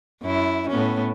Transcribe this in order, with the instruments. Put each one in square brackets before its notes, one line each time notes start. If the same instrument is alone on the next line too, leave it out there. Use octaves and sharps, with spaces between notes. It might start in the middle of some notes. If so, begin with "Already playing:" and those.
[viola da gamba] F#2 E4
A2 B3 C#4